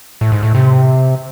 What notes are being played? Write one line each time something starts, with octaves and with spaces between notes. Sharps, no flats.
A2
G#2
A2
C3